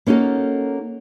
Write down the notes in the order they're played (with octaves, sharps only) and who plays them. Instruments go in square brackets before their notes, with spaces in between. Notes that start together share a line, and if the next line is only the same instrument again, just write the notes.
[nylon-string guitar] A#3 C#4 D#4 F#4 A4